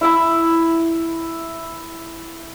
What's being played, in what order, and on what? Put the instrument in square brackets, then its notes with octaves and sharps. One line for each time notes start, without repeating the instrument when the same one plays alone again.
[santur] E4 E5 B5